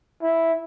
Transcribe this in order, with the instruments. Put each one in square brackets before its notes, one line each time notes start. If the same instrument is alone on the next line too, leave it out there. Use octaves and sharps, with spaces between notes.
[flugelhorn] E4